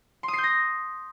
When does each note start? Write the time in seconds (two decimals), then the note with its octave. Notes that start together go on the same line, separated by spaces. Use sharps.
0.23 C6
0.28 D#6
0.33 C7
0.38 G6
0.43 A#6